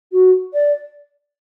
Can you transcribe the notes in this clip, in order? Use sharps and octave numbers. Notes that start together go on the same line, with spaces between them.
F#4
D5